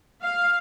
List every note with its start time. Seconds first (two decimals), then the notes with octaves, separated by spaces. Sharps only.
0.23 F5